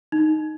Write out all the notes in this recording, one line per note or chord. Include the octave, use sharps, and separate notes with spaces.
D#4